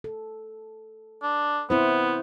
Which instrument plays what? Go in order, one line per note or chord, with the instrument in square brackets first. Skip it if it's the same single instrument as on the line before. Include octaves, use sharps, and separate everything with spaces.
[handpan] A4
[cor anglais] D4
[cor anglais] B3 [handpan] C4 E4 C5